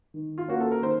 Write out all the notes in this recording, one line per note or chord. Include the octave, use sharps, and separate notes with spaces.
D#3
F4
A#3 C#4 F#4
A4
A#4
D#3 C5